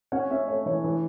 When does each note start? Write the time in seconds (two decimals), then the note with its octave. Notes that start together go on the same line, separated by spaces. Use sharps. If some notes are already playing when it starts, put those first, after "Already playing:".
0.12 C#4 F#5
0.30 C#4 E5
0.48 A3 C#5
0.66 E3 C#5
0.84 E3